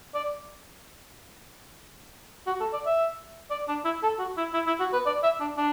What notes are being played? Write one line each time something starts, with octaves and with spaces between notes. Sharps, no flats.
D5
F#4
A4
D5
E5
D5
D4
E4
A4
F#4
E4
E4
E4
F#4
B4
D5
E5
D4
D4